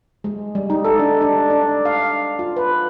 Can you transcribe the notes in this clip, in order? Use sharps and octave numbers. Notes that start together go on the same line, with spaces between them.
G#3
G3
D#4
A4
D4
D4
D4
F5
F4
B4